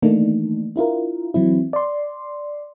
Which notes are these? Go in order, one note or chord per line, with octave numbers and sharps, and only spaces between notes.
D#3 E3 A3 A#3 D4 D#4
D4 E4 F4 A#4
E3 F#3 C4 E4
D5 C6